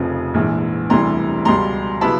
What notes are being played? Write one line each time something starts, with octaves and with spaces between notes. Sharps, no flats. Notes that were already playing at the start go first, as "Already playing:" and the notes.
Already playing: F1 F2 C#3 F3
A#1 G#2 E3
E1 D2 C3 E3 G3 A#5 C6
C#2 B2 G3 A#5 C6
C#3 F#3 B3 E4 A5 B5